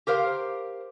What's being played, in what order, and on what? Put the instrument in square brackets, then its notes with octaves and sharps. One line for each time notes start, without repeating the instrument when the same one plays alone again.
[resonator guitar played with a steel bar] G4 A#4 C5 F5